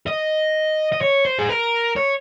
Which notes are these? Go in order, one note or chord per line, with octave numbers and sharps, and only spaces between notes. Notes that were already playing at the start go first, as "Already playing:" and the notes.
D#5
D#5
C#5
C5
G#4
A#4
C#5